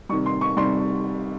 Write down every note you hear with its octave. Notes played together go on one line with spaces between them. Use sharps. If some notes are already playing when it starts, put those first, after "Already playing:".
C3 D#3 G3 C#6
C6
C#6
C3 D#3 G3 C6